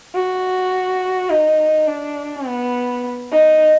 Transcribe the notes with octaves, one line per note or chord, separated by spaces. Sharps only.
F#4
D#4
D4
B3
D#4